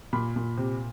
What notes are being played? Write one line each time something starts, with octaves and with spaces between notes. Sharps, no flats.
A#2 B5
A#2
C3